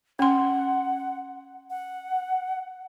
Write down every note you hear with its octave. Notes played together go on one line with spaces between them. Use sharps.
C#4 F#5 C6
F#5